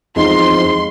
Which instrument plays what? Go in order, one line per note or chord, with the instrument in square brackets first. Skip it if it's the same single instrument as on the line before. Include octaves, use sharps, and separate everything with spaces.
[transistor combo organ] E2 F3 C4 [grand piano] G#3 D#4 [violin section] C6